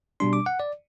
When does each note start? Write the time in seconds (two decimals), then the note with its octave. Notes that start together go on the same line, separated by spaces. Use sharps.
0.20 B2 G3 D4 C6
0.33 D6
0.46 F#5
0.60 D5